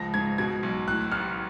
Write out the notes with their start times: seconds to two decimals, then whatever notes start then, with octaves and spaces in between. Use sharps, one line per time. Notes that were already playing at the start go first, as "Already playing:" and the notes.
Already playing: C#2 F3 A#6
0.14 G#2 G#6
0.38 B2 G#6
0.63 B1
0.88 A2 F#6
1.12 A1 F6